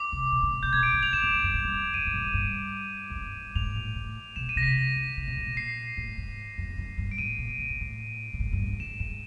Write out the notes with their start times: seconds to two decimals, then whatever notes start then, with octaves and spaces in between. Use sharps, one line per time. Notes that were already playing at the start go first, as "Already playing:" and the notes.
Already playing: D6
0.12 C3
0.32 B2
0.43 C#3
0.53 C3
0.63 B2 G6
0.73 B2 G#6
0.83 D7
0.93 A2
1.03 F7
1.13 A2 E7
1.23 G#2
1.33 G2
1.43 F#2
1.54 G2
1.64 F#2
1.74 F2
1.94 F#2 D#7
2.07 G2
2.14 A2
2.21 G#2
2.34 G2
3.10 F2
3.15 F#2
3.36 G2
3.55 G#2 F7
3.76 A2
3.95 A2
4.36 B2 E7
4.49 D#7
4.56 C3 A#6
4.63 B6
4.77 C3
4.96 D3
5.17 C#3
5.27 C3
5.37 B2
5.46 A#2
5.57 C7
5.97 A2
6.18 G#2
6.58 F#2
6.70 F2
6.78 F#2
6.98 G2
7.11 D7
7.18 A2 D#7
7.38 A#2
7.59 A2
7.70 G#2
7.81 A2
8.33 A2
8.39 G#2
8.53 G2
8.62 F#2
8.67 G2
8.80 G#2 E7
9.00 G#2